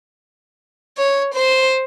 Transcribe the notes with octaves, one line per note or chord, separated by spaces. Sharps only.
C#5
C5